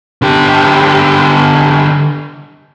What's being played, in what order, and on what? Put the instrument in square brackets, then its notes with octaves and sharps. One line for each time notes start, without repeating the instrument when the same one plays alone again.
[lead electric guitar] D3 G4